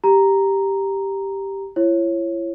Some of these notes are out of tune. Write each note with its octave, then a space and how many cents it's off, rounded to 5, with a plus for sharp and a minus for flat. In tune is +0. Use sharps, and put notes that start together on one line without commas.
G4 +0 A#5 +0
E4 +40 C#5 -20